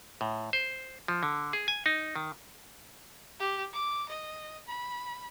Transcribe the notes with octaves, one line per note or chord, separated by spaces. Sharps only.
A2
C5
F3
D3
G#4
G#5
D#4
D#3
G4
D6
D#5
B5